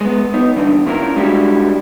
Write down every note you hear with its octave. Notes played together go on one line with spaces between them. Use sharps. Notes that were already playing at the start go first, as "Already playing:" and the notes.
G#3 B3
B3 D#4
G2 D3 E3
A#2 C#4 E4 G#4 A#4
G3 G#3 D4 E4 F#4 G4